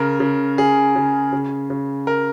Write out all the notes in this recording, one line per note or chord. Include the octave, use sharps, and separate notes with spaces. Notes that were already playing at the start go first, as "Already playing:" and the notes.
Already playing: C#3 A#4
C#3
C#3 G#4
C#3
C#3
C#3
A#4